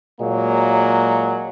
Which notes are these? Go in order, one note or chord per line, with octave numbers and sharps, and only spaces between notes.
A#2 F#3 G#3 A#3